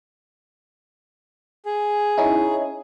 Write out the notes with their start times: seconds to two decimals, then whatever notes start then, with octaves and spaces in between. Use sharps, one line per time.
1.65 G#4
2.18 C#4 D#4 E4